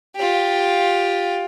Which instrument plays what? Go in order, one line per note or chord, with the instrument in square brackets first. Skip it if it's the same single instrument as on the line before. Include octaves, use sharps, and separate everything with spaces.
[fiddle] F4 G4